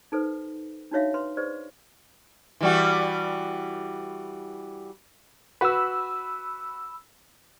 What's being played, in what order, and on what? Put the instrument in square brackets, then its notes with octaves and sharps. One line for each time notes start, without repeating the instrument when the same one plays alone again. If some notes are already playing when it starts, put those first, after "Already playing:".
[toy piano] D#4 A4 B4 C5
D4 D#4 F#4 C#5 E5 F5
B4 C6
G#4 B4 C5 D5
[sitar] E3 G3 F#4
[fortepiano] F#4 B4 [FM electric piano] B5 E6